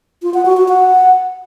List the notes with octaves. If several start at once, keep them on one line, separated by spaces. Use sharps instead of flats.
F4
F#5
F#4
F#4
F#5